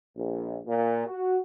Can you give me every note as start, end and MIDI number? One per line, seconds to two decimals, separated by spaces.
0.15 0.59 34
0.66 1.05 46
1.05 1.37 66